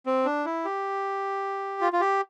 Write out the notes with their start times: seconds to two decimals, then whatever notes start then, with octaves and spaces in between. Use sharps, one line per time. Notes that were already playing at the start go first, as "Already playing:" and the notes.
0.06 C4
0.25 D4
0.46 E4
0.65 G4
1.81 F4
1.93 F4
2.01 G4